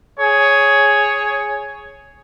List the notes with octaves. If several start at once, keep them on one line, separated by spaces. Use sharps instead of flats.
G#4 C#5